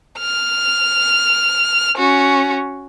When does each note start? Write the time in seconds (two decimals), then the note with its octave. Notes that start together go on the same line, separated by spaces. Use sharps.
0.19 F6
1.97 C#4 F#4